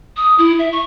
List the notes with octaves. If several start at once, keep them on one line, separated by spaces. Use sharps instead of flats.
D#6
E4
E5
C#6